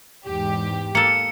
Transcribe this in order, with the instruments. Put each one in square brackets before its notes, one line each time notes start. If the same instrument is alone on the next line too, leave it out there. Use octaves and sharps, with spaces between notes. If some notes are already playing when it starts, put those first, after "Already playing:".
[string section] E2 G#2 G4
[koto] A#3 A4 [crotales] C#7